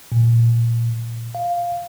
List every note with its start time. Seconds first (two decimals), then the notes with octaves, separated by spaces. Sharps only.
0.12 A#2
1.35 F5